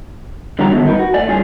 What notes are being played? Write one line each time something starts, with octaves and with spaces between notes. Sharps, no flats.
D3 F#3 G3 G4 A#5
D3 D#3 F#3 G#3 A3 B3
G2 D#4 A#4 B4
F#4
A3 D5 G#5
G2 C#4 F4 G#4 G#5